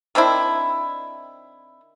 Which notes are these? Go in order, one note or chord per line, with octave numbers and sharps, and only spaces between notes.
D#3 C4 D4 E4